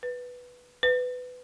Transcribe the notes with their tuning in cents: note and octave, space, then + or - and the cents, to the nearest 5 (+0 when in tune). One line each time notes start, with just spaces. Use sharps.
B4 +0
B4 +15